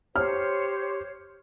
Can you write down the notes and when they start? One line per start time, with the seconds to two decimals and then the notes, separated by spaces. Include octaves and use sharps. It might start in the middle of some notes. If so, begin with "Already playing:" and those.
0.16 G4 C5 C#5 F6